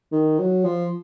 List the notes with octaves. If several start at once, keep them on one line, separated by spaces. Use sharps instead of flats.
D#3
F#3
F3